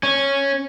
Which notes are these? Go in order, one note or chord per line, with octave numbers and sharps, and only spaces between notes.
C#4